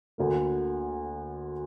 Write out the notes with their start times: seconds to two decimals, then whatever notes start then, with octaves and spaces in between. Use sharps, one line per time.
0.18 D2 D3 A#3